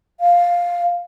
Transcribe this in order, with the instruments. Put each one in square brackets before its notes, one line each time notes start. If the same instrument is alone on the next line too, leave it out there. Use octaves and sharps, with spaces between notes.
[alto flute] F5